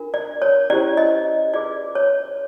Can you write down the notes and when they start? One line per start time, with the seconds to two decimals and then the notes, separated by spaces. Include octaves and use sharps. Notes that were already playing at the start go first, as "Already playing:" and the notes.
Already playing: D4 F4 A#4
0.14 D5
0.42 C#5
0.70 C#4 E4 G4 C5 D5
0.97 D#5
1.53 F4 G#4 B4 D5
1.95 C#5